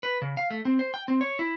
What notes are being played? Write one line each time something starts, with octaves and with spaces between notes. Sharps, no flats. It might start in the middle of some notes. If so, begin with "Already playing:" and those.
B4
C#3
F5
A3
C4
C5
G5
C4
C#5
E4